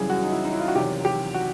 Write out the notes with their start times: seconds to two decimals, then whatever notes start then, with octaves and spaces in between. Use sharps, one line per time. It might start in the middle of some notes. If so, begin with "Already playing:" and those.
Already playing: F#2 C#3 E3 G3 G#4
0.10 F#4
0.23 D#4
0.32 E4
0.45 D#4
0.53 E4
0.60 F4
0.68 F#4
0.75 E2 C3 D#3 F#3 G4
1.05 G4
1.34 F#4